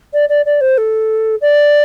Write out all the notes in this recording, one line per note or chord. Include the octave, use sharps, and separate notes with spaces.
D5
D5
D5
C5
A4
D5